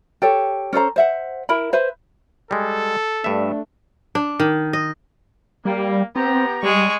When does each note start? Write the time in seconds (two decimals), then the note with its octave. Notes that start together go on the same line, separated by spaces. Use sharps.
0.22 G4 A4 C#5
0.73 C#4 A4 C5 A#5
0.96 C5 E5 F#5
1.49 E4 A#4 B5
1.73 B4 C5 E5
2.51 G3 G#3 A4
3.24 G2 A3 D4 E5
4.15 D4
4.40 D#3
4.73 D#5
5.65 G3 A#3
6.16 B3 C4 G4 A#5
6.63 G3 G#3 C#6